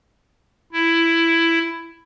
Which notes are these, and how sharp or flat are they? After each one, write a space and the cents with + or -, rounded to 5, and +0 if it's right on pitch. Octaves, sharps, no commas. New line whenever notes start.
E4 +10